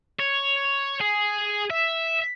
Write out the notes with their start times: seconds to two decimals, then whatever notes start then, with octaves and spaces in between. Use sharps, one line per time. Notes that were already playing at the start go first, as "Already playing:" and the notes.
0.20 C#5
1.01 G#4
1.70 E5